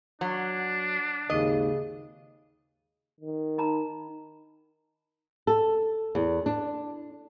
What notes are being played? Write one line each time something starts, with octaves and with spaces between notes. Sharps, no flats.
F#3 D4
G#1 D#2 C#3 D#5
D#3
D#4 A#5 B5
A4
E2
D4